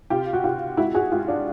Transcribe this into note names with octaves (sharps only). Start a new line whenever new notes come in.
C3 F4 G4
F#4
C3 F4 G4
G#3 E4 F#4
F#4 G#4
G#3 F4 G4
D4